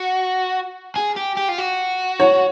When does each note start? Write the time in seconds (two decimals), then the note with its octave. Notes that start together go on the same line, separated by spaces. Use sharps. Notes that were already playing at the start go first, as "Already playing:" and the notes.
Already playing: F#4
0.96 G#4
1.16 G4
1.37 G4
1.48 F4
1.58 F#4
2.20 C#5